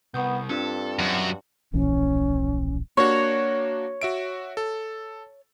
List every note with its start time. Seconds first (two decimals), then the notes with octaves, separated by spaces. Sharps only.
0.14 C2 B3 C#6 D#6 G6
0.49 G2 C4 D4 F4 A4
0.99 F#2 F#4
1.73 D1 A#1 E3 C#4
2.97 A#3 D4 F#4 C#5
4.02 F#4 E5 D7
4.57 A4